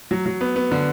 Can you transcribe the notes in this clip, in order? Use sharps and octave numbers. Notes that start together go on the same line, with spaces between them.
F#3
F#3
B3
B3
D3